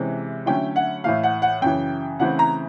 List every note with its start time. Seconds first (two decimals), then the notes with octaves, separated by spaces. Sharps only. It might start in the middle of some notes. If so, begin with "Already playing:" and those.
Already playing: C3 E3 G#3 C#4
0.46 D3 F#3 A3 C#4 E4 G5
0.76 F#5
1.04 A2 E3 A3 F5
1.23 F#5
1.42 F#5
1.61 F#2 C#3 E3 G5
2.19 C#3 E3 A3 C4 F#5
2.39 A#5